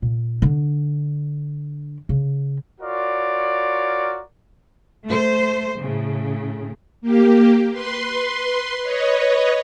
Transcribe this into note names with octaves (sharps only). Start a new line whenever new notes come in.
A#2
D3 D4
C#3
F4 F#4 A#4 C#5 D5
A3 C5
A2 C#3
A#3 G4
B4 C6
B4 C#5 D#5